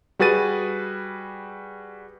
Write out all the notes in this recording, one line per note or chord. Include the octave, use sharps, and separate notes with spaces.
G3 F#4 G#4 B4 A6 D#7